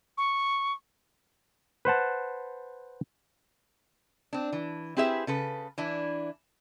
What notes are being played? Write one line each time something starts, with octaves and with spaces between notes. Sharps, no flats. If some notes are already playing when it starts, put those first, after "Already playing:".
C#6
B4 C5 F#5 A5
C4 D4
E3
C4 E4 G4 G#4 B4 E5
C#3 A4 B4
E3 D4 E4